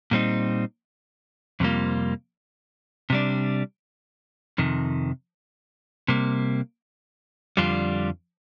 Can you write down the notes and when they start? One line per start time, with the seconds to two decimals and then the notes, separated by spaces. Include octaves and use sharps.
0.11 A#2 G3 C4 D#4
1.60 F2 C3 G3 A#3 F4
3.10 C3 G3 D4
4.58 F2 C3 D#3
6.08 C3 G3 A#3
7.57 F2 D3 G3 D4 F4